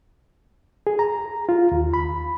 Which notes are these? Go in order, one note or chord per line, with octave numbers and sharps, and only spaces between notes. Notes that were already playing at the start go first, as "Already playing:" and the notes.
G#4
A#5
F4
D#2
B5